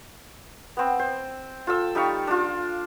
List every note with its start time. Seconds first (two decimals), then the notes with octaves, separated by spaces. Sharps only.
0.77 B3 C4
0.99 C5
1.67 F4 A4 E6
1.95 G3 D#4 F5 C#6
2.27 D4 F4